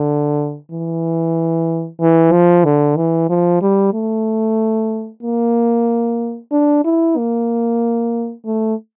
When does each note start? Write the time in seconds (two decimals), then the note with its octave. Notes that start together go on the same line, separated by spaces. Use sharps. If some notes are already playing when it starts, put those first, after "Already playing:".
Already playing: D3
0.71 E3
2.00 E3
2.32 F3
2.64 D3
2.96 E3
3.29 F3
3.62 G3
3.94 A3
5.23 A#3
6.52 D4
6.85 E4
7.17 A#3
8.45 A3